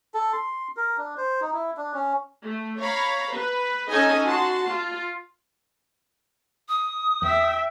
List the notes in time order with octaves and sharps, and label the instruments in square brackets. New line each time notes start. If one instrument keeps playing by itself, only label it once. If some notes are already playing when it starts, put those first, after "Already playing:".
[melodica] A4
C6
A#4
D4
C5
D#4
E4
D4
C#4
[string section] A3
C#5 F5 A#5 B5
B4
C#4 D#4 A4 D#5 G#5
F#4 A5 C6
F4
[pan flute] D#6
[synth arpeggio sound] E2 [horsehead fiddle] E5 G5